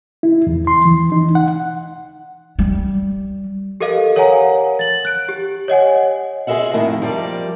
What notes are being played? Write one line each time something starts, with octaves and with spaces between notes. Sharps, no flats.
E4
E2
C6
E3
D#4
F#5
G3
G4 A4 A#4 D#5 F5
A#4 C#5 F5 F#5 G#5 A#5
A6 F#7
F#6 D7
G4
C#5 D#5 F#5 G#5
F4 G#4 B4 D#5 E5 F#5
F2 A2 D#3 A#3 E4
F3 G3 A#4 C5 D5